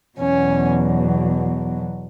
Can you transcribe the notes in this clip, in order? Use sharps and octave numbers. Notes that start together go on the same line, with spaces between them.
E2 B2 F#3 C#4